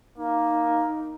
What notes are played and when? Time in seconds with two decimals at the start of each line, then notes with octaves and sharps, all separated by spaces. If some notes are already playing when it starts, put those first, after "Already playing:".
0.18 A#3 D#4